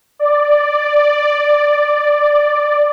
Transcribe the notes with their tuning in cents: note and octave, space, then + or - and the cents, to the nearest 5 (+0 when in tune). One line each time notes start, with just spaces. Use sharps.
D5 +5